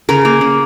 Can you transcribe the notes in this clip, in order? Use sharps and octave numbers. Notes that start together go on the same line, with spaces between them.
C#3 A#4
A#3
C#3